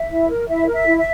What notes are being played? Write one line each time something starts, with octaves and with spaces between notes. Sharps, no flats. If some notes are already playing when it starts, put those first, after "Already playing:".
Already playing: E5
E4
A#4
E4 E5
A#4
E5
E4
E5